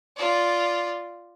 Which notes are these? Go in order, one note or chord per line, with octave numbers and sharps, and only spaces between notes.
F4 D5